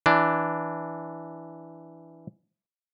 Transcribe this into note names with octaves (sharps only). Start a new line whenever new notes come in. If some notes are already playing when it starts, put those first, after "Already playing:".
E3 D4